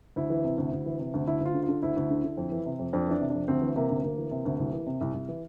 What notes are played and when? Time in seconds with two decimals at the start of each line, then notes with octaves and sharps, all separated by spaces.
0.16 D2 E4
0.30 E3
0.44 C3
0.58 D2
0.72 D2
0.86 E3
0.99 C3
1.14 D2
1.27 D2 E4
1.41 D2 F4
1.54 D3
1.63 F4
1.69 D3
1.83 D2 E4
1.97 D2
2.10 D3
2.24 D3
2.37 F2
2.52 E3
2.66 C3
2.79 F2
2.93 F2 D4
3.07 E3 D4
3.21 C3
3.30 F2 D4
3.48 D2 C4
3.62 E3
3.76 C3 A#3
3.90 D2
4.03 D2 A#3
4.18 E3
4.31 C3
4.46 D2
4.59 C2
4.73 E3
4.86 C3
5.01 C2
5.14 C2
5.29 E3